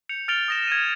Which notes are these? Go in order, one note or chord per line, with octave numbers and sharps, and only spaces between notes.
G6 C#7 F7
F6 A6 D7 F7 G7
D#6 A#6 E7
G#6 D#7